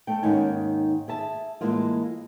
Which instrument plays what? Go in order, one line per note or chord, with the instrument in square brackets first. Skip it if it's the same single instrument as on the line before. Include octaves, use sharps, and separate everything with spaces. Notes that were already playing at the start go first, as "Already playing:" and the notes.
[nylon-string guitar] A3 G5
D#2 G#2 D#3 C#4 G#5
G#4 E5 A5
A2 E3 G#3 A#3 F4